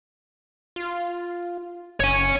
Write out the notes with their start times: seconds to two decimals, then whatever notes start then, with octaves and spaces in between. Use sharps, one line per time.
0.76 F4
2.00 F#1 C#5 G#5